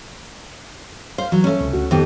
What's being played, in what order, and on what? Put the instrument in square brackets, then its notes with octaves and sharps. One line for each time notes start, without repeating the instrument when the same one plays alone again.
[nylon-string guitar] C5 [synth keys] F5
[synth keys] E3 [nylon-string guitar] F#3
[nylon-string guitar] A3 C#4
[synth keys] C#2 C3
D2 F#4
[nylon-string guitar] F2 B3 [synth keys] D#3 G4